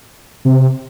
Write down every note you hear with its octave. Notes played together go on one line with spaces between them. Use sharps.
C3